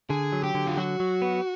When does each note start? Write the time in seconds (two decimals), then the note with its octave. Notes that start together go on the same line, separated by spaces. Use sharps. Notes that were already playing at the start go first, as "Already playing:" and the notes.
0.10 D3 G#4
0.33 F#3
0.43 G4
0.55 D3
0.67 F4
0.78 F#3 F#4
1.00 F#3
1.22 B3